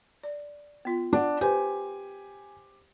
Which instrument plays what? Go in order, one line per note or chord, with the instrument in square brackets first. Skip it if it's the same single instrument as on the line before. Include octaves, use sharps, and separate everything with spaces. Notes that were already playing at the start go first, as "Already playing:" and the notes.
[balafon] D5
B3 F4
[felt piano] D4 [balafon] F#5 G5
[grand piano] G4 C5 [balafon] B4 [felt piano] G#5